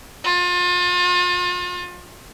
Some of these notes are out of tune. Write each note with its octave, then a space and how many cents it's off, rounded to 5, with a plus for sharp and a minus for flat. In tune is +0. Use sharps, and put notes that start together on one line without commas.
F4 +35